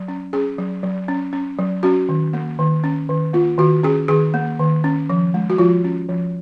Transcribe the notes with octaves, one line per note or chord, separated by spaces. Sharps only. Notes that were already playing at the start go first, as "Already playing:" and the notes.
Already playing: F#3
C#4
C#4 G#4
F#3
F#3
C#4
C#4
F#3
C#4 F#4
D#3
A#3
D#3
C#4
D#3
A#3 F4
D#3 F#4
C#4 G#4
D#3 G#4
A#3
D#3
C#4
F3
G#3
F#4
F3 F4
C#4
F3